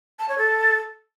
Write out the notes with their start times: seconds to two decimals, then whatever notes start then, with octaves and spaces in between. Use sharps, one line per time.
0.19 A5
0.29 C#5
0.38 A4